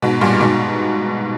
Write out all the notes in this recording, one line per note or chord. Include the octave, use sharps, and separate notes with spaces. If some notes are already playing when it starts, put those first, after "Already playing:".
G#2 B2
G2 A#2
G#2 B2